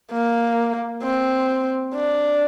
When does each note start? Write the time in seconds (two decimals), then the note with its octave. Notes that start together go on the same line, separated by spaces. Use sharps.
0.11 A#3
1.03 C4
1.95 D4